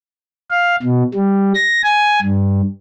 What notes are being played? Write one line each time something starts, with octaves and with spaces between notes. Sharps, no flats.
F5
B2
G3
A#6
G#5
G2